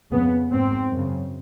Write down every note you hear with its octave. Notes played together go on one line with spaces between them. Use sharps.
F2 C#3 B3
G#2 C4
F#2 C#3